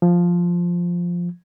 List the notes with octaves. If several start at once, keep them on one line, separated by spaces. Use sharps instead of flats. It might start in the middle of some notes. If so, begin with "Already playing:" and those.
F3